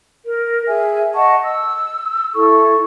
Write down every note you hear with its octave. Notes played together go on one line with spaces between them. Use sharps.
A#4
G#4 E5 G#5
D#5 F#5 A5 C#6
E6
E4 A4 C#6